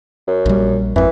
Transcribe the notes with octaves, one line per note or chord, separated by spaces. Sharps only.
F#2
A#1 G3
G#1 F2 E3